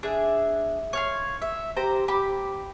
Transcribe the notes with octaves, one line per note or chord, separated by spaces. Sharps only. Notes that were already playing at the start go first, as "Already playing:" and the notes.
D4 G#4 E5
C#5 F5 C6
E5
G4 C5 A#5
G4 B5